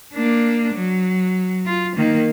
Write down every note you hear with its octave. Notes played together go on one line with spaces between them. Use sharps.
A#3 D4
F#3
F4
D#3 A#3